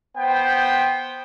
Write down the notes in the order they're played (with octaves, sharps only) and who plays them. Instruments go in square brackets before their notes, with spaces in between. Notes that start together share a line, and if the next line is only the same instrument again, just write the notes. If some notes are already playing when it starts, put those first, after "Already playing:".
[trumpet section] B3 C5 G5